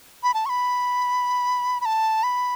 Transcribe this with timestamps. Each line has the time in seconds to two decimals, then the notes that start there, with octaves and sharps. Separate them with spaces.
0.23 B5
0.34 A5
0.46 C#6
0.49 B5
1.81 B5
1.85 A5
2.23 B5